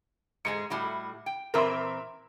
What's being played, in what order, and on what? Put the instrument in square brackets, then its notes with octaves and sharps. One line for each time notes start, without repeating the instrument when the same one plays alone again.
[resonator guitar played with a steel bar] G#2 G#3 G#4 [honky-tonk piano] C#7
[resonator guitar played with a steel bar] A2 G3 F#4
G5
[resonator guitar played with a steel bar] A#2 E3 C4 [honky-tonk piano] A#4 E5 C6